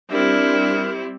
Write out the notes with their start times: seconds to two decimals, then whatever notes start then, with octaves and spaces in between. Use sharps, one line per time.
0.12 G3 C4 D4 E4 A#4